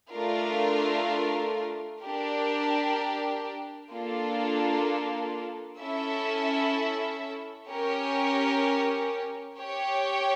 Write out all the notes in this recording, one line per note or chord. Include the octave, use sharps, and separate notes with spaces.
A3 D4 F4 A#4
D4 G4 A#4
A#3 D4 F4 A4
C#4 E4 A4 E5
C#4 G4 A#4 C#5
G4 C#5 G5